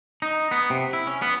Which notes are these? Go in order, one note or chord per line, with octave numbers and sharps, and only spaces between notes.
D#4
B3
C3
E4
C#4
B3